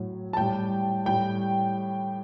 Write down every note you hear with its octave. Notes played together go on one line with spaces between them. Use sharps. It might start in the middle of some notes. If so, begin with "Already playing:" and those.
Already playing: A2 F#3
A5
A2 G3 G5
A2 G3 G5